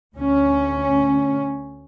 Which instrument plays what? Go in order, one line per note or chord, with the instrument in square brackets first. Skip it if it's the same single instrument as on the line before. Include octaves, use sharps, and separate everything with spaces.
[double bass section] D2 C#4